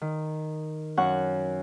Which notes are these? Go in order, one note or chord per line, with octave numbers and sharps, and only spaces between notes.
D#3
F#2 F#5 C#6